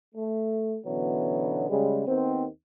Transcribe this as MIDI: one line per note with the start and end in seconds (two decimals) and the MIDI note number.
0.15 0.76 57
0.86 1.66 47
0.86 1.66 50
0.86 1.66 52
0.86 1.66 54
0.86 1.66 59
0.86 1.66 61
1.69 2.03 49
1.69 2.03 55
1.69 2.03 56
2.06 2.46 39
2.06 2.46 51
2.06 2.46 59
2.06 2.46 60